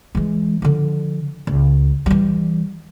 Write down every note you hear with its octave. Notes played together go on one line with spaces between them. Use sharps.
E3 G#3
D3 F3
C#2
E3 G3